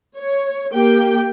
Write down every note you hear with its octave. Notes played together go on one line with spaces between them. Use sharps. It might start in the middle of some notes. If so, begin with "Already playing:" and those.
C#5
A#3 G4 G5